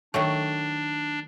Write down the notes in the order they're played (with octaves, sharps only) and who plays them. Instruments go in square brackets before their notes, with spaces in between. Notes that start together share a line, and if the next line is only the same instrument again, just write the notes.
[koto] D#3 F#3 A3 [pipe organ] D4